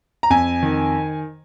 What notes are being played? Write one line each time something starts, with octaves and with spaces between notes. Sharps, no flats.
A#5
F2 G#5
D#3